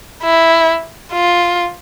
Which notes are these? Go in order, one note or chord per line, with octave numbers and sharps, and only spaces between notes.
E4
F4